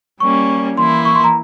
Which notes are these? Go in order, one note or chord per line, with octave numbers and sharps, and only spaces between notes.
G3 A#3 C#4 C#6
E3 A#3 E4 C6
C#6
C6
A#5